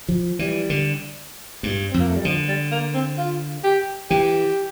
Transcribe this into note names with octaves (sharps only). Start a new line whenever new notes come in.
F3
E3 G3
D3
G2
C4
F2
A#3
A3
G3
D3 F3
G3
A#3
C4
F4
G4
E3 G4